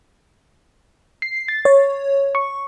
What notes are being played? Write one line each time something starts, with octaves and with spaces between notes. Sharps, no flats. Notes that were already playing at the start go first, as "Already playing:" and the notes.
C7
A6
C#5
C#6